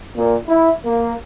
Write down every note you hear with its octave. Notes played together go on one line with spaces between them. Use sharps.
A#2
E4
A#3